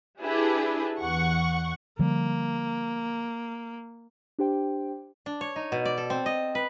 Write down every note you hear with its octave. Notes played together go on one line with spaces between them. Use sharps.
D4 E4 G4 G#4 B4
E2 F#5 C#6
D3 F3 G3 A#3
D4 G4 C5 G5
D4
C#5
D#4
B2
D5
A4
C4
D#5
B4